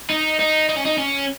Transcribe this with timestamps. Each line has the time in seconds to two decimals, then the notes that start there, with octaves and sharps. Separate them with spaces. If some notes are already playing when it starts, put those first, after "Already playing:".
0.10 D#4
0.39 D#4
0.69 D#4
0.77 C#4
0.85 D#4
0.98 C#4